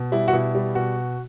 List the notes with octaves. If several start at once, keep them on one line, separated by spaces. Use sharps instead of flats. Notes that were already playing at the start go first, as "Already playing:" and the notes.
Already playing: B2
G3 E4
F#4
B2 E4
G3
B2 F#4